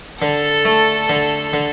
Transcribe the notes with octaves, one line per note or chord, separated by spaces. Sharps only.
D3 A4
A3
D3
D3